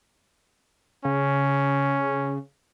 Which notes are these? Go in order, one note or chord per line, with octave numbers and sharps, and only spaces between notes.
C#3 C#4